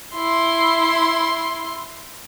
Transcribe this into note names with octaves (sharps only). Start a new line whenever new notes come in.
E4 C6